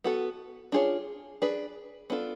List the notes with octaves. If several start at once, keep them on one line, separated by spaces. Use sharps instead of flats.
B3 F#4 A4
D4 F4 G#4 C#5
D4 G#4 B4
B3 D4 F4 A4